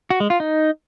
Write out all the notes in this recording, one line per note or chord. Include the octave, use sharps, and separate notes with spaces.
F#4
G#3
F4
D#4